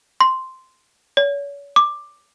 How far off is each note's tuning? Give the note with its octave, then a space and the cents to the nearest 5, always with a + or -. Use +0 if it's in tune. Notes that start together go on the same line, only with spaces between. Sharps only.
C6 -5
C#5 +35
D6 +10